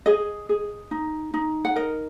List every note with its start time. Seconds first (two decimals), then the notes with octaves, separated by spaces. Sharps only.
0.06 G#4 D#5
0.49 G#4
0.91 D#4
1.34 D#4
1.65 F#5
1.76 A#4 D#5